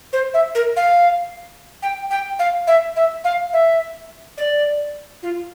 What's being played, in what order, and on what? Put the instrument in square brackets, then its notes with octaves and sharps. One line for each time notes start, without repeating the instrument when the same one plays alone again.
[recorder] C5
E5
A#4
F5
G5
G5
F5
E5
E5
F5
E5
D5
F4